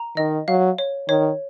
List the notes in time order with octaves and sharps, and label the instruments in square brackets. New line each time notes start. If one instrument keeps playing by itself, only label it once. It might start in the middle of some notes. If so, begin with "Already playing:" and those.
Already playing: [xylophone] A#5
[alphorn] D#3 [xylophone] D#5
[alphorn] F#3 [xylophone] F5
[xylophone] C#5
[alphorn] D#3 [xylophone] C#5